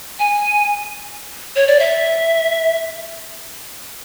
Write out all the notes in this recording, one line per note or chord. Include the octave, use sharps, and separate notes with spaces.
G#5
C#5
D5
E5